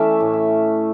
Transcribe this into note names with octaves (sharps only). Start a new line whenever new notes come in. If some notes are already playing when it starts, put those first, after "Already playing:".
Already playing: E3 A3 C#4 D5 E5
A2
E5